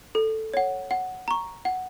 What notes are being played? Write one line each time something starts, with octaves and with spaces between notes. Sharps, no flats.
A4
C#5 F#5
F#5
A#5 C#6
F#5